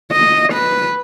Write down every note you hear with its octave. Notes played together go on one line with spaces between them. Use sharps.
D#5
B4